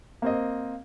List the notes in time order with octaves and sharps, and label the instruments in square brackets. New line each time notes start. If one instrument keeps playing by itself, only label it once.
[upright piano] A#3 C4 D#5